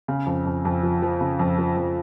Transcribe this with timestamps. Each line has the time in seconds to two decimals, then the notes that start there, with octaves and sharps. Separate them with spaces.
0.08 C#3
0.26 F2
0.46 F2
0.65 F2
0.83 F3
1.02 F3
1.21 C#3
1.39 F2
1.58 F3
1.77 F2